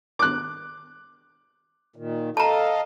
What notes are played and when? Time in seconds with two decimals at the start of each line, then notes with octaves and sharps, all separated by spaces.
0.19 D6 F#6
1.96 A#2 D#3
2.37 A4 D#5 F5 A5 A#5